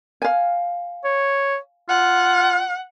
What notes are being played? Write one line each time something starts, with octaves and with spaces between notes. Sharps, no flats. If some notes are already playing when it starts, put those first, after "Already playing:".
F5 G#5
C#5
F4 F#5